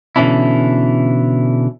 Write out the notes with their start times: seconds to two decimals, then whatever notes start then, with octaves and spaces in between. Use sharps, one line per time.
0.16 B2 D3 E3 C#4 D4 E4